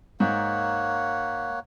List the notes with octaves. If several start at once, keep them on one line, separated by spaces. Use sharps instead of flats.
G#2 A#3 C#5 F#5